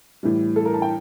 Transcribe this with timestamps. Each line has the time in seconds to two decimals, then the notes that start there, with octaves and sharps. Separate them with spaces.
0.23 A2 E3 G3
0.56 A4
0.65 A#4
0.74 A5
0.82 G5